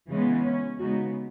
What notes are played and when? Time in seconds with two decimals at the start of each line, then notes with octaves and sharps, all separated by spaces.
0.11 C#3 E3 G#3 B3 C#4
0.46 C#4
0.80 C#3 G#3 B3 D#4 F#4